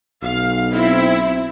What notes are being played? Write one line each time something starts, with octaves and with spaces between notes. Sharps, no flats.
B1 F5
C4 E4